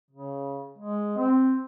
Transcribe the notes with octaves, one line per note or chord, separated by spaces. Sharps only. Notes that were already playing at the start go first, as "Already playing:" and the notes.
C#3
G#3
C4